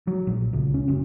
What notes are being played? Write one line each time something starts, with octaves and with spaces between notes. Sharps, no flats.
F#3
A#1
C#2
C#4
F#1